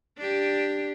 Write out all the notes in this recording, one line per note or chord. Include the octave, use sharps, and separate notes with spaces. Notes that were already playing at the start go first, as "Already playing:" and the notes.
D4 G4